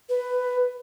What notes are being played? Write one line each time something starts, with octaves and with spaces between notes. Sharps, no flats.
B4